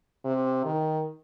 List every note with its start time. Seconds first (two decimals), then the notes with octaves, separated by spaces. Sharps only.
0.25 C3
0.65 D#3